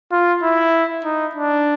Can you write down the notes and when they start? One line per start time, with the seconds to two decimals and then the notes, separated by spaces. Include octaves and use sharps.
0.12 F4
0.43 E4
1.04 D#4
1.35 D4